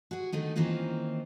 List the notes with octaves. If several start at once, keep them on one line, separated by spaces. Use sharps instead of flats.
F#4 G#4
D3 D#3 A3 D#4
D#3 E3 A#3 C4 C#4 F4